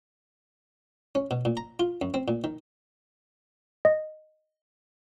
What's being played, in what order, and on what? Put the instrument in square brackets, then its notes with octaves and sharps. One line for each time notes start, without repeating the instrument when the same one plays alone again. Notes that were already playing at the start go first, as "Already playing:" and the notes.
[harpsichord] C#4
B2
A#2
A#5
F4
F#2
C4
A#2
D#3
[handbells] D#5